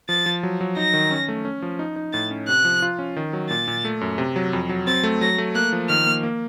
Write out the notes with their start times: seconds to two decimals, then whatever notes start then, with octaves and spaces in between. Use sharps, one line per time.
0.09 F3 A6
0.26 F3
0.43 F#3
0.61 F#3
0.77 D#4 A#6
0.94 D#3
1.11 C#4
1.28 A3
1.45 C#4
1.62 F3
1.79 D#4
1.96 D#4
2.13 A2 A6
2.30 C#4
2.48 C3 F#6
2.65 F3
2.82 F4
2.99 C#4
3.16 D#3
3.33 F#3
3.50 A#2 A6
3.68 A#2
3.85 A3
4.01 F#2
4.18 C3
4.36 F#3
4.53 F2
4.69 F#3
4.87 C4 A6
5.04 A3
5.21 F#3 A#6
5.38 A3
5.55 A#3 F#6
5.72 F3
5.89 D#3 F6
6.06 A#3
6.23 A#3